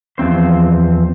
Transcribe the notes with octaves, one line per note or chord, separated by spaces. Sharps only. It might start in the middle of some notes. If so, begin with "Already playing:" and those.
E2 F3 C4 C5